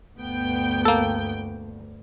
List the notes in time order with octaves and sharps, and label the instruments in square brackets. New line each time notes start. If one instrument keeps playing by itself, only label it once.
[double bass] D2 G2 [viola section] B3 G5
[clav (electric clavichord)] A#3 A4